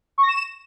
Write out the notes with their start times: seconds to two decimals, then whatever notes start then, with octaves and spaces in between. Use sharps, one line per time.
0.18 C#6
0.23 A#6
0.28 E7